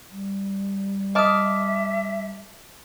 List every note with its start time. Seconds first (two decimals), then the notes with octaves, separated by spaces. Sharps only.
0.11 G3
1.15 D#5 E5 A5 D6 D#6 F6